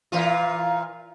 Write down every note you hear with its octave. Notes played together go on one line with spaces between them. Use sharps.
A#2 E3 F4